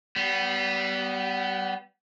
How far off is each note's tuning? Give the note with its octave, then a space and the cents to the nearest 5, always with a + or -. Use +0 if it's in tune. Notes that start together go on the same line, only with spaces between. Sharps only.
G3 -35 B3 +0